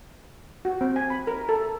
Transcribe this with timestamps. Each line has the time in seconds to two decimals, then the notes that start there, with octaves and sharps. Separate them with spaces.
0.65 F#4
0.81 C4
0.96 G#5
1.10 B5
1.27 A#4
1.49 A4